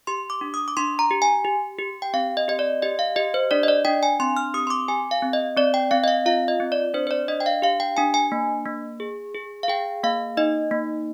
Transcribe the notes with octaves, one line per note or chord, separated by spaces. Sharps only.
G4 C6
D6
D4
D#6
D6
D4 C6
A#5
G4
G#5
G4
G4
G5
C4 F5
D#5
G4 D#5
D5
G4 D#5
F5
G4 D#5
C5
D4 D5
D#5
D5
D4 G5
G#5
C4 C6
F6
G4 D#6
C6
D6
G4 G#5
F5
C4
D#5
C4 D5
G5
C4 F5
D#5
F5
F4 F5
D#5
C4
D5
D4 C5
C5
D5
D4 D#5
G5
F5
G4 F5
G5
D4 G#5
G#5
A#3
A#3
G#4
G#4
F5
G#4 G5
A#3 F5
D#4 D#5
A#3